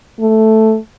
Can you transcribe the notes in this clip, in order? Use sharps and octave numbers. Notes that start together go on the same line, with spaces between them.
A3